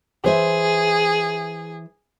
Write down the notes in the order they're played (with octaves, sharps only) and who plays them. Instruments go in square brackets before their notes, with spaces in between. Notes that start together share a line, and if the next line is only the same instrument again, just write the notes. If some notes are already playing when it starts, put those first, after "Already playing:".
[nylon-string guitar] E3 C5 E5 [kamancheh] G#4